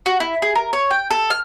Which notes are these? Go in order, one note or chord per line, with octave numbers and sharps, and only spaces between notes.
F#4
E4
G#4
A#4
C#5
G5
A4
F6